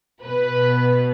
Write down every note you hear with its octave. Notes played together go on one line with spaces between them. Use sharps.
B2 B4